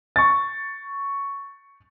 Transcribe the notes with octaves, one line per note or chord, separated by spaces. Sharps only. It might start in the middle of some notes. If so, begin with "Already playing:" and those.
C#6 A6